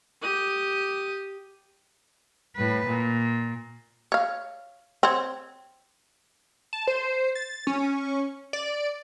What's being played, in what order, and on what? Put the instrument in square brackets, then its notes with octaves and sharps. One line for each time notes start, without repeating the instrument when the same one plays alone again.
[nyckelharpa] G4 D#6
[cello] A2 B4
A#2
[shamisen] C#5 F5
C4 C#5
[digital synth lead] A5
C5
A6
C#4
D5